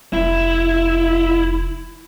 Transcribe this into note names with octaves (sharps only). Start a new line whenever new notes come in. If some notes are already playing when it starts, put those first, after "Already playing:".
F1 E4